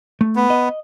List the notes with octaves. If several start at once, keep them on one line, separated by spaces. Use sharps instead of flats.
A3
B3
D#5